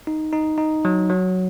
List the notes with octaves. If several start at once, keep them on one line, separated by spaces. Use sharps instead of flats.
D#4
D#4
D#4
F#3
F#3